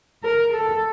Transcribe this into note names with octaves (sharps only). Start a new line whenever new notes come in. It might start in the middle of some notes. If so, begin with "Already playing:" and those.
A#4
A4